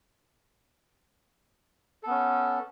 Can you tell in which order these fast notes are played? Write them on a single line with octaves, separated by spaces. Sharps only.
A4 B3 C#4